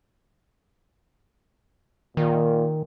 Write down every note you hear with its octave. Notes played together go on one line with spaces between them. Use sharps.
A#2 D#3